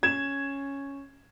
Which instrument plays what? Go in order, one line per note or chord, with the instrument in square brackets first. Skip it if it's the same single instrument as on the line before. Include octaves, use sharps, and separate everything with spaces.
[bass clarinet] C#4 [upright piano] G#6 E7